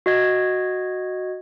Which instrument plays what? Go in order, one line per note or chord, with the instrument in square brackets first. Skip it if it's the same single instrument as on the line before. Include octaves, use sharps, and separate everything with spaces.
[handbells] F#4 D#5 G#6